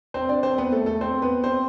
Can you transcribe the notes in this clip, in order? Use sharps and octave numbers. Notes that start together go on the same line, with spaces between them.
C4 C5
D4 D5
C4 C5
B3 B4
A3 A4
A3 A4
C4 C5
B3 B4
C4 C5